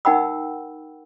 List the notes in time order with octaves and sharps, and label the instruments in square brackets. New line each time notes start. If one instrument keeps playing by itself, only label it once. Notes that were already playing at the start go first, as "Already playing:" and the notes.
[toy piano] D#4 A#4 F#5 G5 B5 E6